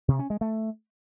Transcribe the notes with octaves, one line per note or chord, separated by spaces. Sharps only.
C3
C#4
G#3
A3